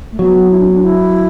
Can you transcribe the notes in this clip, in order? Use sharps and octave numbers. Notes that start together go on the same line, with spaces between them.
A3
F#3 B3
E4
D4
B3
D4
E4